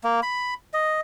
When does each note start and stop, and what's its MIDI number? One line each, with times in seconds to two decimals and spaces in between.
0.04 0.21 58
0.23 0.54 83
0.74 1.01 75